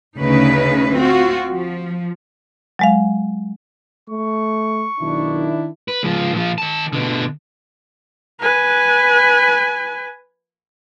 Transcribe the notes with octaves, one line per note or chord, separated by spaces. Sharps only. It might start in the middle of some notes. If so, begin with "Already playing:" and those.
D2 C#3 D#4 B4
C4 F4 F#4
F3
F#3 G#3 F5
A3 C#6
B1 D#3 D4 E4
B4
C#2 F3
A#2 F3
D#3 A5
B2 D3
B4 G#5